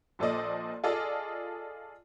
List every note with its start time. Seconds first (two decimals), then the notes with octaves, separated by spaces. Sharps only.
0.19 A#1 A#2 A4 C5 D5 D#5
0.84 F4 G#4 A4 D5 D#5